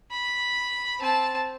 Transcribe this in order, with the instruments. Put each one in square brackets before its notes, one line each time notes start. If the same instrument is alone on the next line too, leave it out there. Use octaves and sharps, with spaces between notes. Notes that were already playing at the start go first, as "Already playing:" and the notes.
[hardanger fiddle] B5
C4 A5